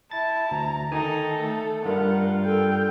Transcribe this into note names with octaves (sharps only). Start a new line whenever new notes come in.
E4 A5 A6
D2 A#5
D#3 D#4 A4 G#5
A3
G2 G3 F4 A#4 F#5
A4 G5